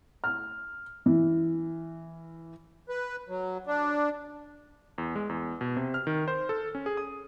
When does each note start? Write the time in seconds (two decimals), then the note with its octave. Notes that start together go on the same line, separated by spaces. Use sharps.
0.24 F6
1.06 E3
2.89 B4
3.28 F#3
3.67 D4
4.98 E2
5.15 G#3
5.29 E2
5.61 B2
5.77 C3
5.94 F6
6.07 D#3
6.28 C5
6.49 A4
6.75 C#4
6.86 G#4
6.97 D#6